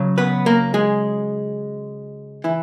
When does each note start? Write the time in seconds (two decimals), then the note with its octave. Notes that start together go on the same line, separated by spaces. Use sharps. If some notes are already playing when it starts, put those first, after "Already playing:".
Already playing: C#3 F#3
0.18 B3 B4
0.46 A#3 A#4
0.74 G#3 G#4
2.44 E3 E4